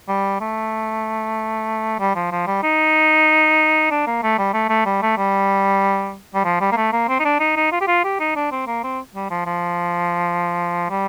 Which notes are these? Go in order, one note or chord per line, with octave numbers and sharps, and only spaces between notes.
G3
A3
G3
F3
F3
G3
D#4
D4
A#3
A3
G3
A3
A3
G3
A3
G3
G3
F3
G3
A#3
A3
A#3
C4
D#4
D4
D#4
D#4
F4
G4
F4
G4
D#4
D4
C4
A#3
C4
G3
F3
F3
G3